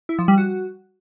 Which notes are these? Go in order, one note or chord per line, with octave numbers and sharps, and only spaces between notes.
E4
F3
G3
F#4